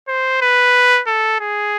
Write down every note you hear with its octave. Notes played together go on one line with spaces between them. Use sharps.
C5
B4
A4
G#4